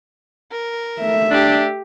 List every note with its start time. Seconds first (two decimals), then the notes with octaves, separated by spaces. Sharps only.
0.51 A#4
1.00 A3 E5
1.31 D4 G4